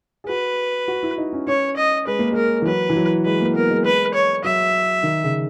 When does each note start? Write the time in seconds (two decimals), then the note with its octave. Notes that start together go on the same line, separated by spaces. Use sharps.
0.24 G#4
0.28 F#4 B4
0.88 F#4
1.03 E4
1.18 D#4
1.33 C#4
1.47 C#4 C#5
1.77 D#5
2.07 G#3 B4
2.19 A#3
2.32 G#3 A#4
2.62 E3
2.66 F#3 B4
2.89 E3
2.96 F#3
3.25 G#3 B4
3.41 A#3
3.55 B3 A#4
3.71 G#3
3.85 B4
4.14 C#5
4.44 F#3 E5
5.03 D#3
5.24 C#3